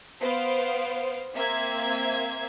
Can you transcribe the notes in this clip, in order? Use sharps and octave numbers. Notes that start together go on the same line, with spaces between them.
B3 C5 F5 D7
A#3 C4 E5 G#6